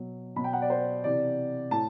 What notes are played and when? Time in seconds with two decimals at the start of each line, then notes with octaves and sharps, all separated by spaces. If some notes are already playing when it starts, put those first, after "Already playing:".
Already playing: B2 F#3
0.36 B2 F#3 B5
0.44 G5
0.53 F#5
0.62 D5
0.70 C5
1.04 C3 E3 D5
1.71 A2 A5